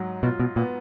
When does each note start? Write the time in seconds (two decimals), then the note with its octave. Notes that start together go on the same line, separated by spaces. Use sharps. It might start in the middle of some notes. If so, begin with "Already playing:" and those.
Already playing: G#2 F#3
0.23 B2 F4
0.40 B2
0.56 A#2 B3